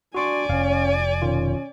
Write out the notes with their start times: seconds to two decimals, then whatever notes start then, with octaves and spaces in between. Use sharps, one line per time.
0.15 D4 F#4 D5 G#5 C6 C#6
0.50 F1 C#4 F5
1.22 B2 D#3 C#4 F4